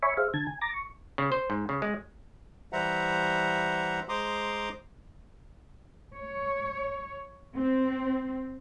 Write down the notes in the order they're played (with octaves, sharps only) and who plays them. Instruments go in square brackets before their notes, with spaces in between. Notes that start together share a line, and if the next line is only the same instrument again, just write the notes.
[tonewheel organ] C#5 E5 G#5 B5 C#6
G#4 C5 E5 F5
D3 A5 G#6
G#5
A#5 D6 A6 A#6
C#6
[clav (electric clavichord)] C#3
C5
G#2
C#3
G#3
[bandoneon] E3 G3 C5 E5 F#5 A#5
G#3 C5 A#5 C6 D6 D#6
[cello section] C#5
C4